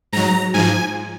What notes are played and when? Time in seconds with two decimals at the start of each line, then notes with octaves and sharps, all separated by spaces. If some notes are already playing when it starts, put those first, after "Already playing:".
0.12 G#2 F#3 A#5
0.54 G#2 F3 G#5